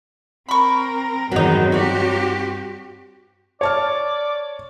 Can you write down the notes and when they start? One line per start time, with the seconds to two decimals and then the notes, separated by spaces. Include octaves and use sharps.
0.48 C4 A#4 B5 C#6
1.32 E2 G2 D#3 F#3 C4 D#4
1.72 F#4 G4 C#5 D5
3.61 C#5 D5 A5 F6